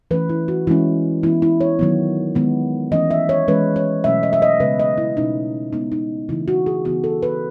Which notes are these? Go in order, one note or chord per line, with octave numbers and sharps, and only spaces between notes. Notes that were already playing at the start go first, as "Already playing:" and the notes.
E3 A3 C#4 B4
E4
F#4
E3 G#3 C#4 E4
E3 B3 E4
E4
C#5
D#3 F#3 B3
D#3 G#3 B3
E3 A3 C#4 D#5
E5
C#5
E3 G#3 C#4 B4
C#5
B2 F#3 A3 C#4 E5
D#5
E5
D#5
C#3 G#3 B3 B4
D#5
E4
B2 A3 C#4 D#4
C#3 G#3 B3 D#4
D#4
C#3 E3 A3 E4
F#4
G#4
C#3 E3 B3 F#4
A4
B4